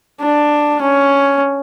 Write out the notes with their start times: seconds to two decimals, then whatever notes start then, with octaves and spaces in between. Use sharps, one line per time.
0.21 D4
0.82 C#4